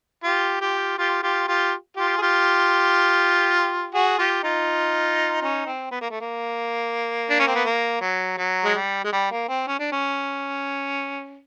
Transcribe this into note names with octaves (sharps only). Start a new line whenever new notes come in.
F4 G4
F4 G4
F4 G4
F4 G4
F4 G4
F4 G4
G#4
F4 G4
F#4 G#4
F4 G4
D#4 F4
C#4 D#4
C4
B3
A#3
A3
A#3
D4
C#4
C4
B3
A#3
F#3
F#3
G#3
G3
G#3
G3
A#3
C4
C#4
D4
C#4